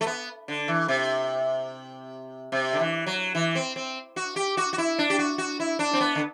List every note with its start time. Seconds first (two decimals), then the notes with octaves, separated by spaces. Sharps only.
0.01 A3
0.07 B3
0.48 D3
0.68 E3
0.88 C3
2.52 C3
2.73 D3
2.79 E3
3.06 F#3
3.35 E3
3.55 C4
3.76 C4
4.16 F#4
4.36 G4
4.57 F#4
4.73 F#4
4.78 E4
4.99 D4
5.10 G4
5.19 F#4
5.38 F#4
5.60 E4
5.79 D4
5.93 C4
6.00 B3
6.15 D3